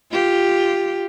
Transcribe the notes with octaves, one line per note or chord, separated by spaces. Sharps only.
F4 G4